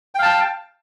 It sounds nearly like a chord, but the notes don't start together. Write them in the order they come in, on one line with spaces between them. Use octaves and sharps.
G5 F5 A5